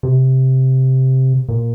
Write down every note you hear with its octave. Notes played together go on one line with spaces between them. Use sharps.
C3
A#2